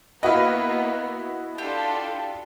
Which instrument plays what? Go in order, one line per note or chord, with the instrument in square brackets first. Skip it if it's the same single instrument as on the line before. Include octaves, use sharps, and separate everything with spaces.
[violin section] A#3 B3 [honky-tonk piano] E4 F#4 D#5 [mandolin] B4 F5
[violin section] D4 F4 A4 [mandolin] G4